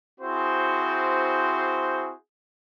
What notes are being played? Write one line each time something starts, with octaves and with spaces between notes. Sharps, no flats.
C4 E4 F#4 G#4 C5